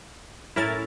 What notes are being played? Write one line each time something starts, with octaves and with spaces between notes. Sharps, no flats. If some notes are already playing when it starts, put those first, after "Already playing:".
A2 C#4 E4 A#4 E5 A6